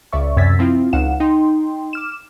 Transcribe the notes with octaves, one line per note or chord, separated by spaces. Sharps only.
C#2 C#3 D5 E5 C#6
F#2 C3 E6 G#6 A6 B6
F3 C4 E4 F4
C#2 D#4 F5 F#5 E7
D#4 G5 C6
D6 F6 E7